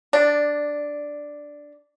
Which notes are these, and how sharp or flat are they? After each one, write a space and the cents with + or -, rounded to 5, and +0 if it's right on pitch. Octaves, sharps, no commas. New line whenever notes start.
D4 +0 D5 +15